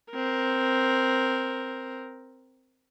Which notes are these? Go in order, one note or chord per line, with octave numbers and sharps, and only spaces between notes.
C4 A#4